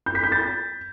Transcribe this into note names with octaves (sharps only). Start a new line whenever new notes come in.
G6
B6
G6
A6